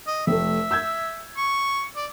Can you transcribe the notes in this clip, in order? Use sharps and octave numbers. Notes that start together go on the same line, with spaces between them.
D#5
F1 A3 E5
E6 G6 G#6
C#6
D5